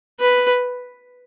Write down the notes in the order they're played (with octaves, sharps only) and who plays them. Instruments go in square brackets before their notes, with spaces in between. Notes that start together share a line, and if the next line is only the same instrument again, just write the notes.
[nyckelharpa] B4